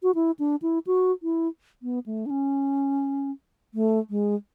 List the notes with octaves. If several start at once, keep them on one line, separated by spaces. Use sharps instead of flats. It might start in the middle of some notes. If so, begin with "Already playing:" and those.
F#4
E4
D4
E4
F#4
E4
B3
A3
D4
C#4
A3
G#3